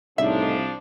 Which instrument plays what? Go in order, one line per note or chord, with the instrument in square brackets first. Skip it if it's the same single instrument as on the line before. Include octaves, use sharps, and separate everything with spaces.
[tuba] C2 [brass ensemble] A2 C#3 D#4 [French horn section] F3 D4 [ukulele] E5